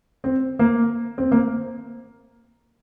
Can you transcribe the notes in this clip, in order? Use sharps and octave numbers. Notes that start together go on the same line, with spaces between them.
C4
A#3
C4
A#3